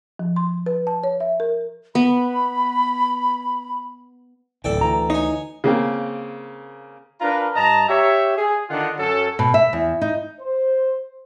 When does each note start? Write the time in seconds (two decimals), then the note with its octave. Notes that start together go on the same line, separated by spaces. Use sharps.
0.19 F3
0.36 C6
0.66 B4
0.87 A5
1.04 C#5
1.20 E5
1.40 A#4
1.95 B3 B5
4.64 D1 G#1 E3 A4 D5 G5
4.81 D2 E3 A#5
5.10 D#4 C#5 G#5
5.64 C#3 A#3 C4
7.20 D4 F4 A#4 B4 A#5
7.55 G2 D#5 A5 A#5
7.89 G4 C#5 E5
8.37 G#4
8.70 D3 D#3 D4 D#4 F4 F#5
8.99 F#2 F#3 C#4 A4
9.39 B2
9.54 E5
9.73 E2
10.01 D#4
10.41 C5